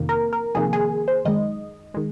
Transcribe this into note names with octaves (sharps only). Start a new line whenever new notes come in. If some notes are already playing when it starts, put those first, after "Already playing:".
Already playing: F2 C3 D#3 A#3
A#4
A#4
F2 C3 D#3 A#3 G#4
G#4
C5
F#2 D#3 G#3 D#5
D#3 G#3